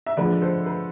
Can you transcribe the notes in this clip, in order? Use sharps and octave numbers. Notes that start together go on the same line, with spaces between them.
E5
D3 F3 G#3 B4 D5
A4 C5
B4